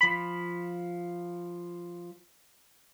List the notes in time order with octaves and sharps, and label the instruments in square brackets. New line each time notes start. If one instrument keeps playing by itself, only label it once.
[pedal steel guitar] F3 B5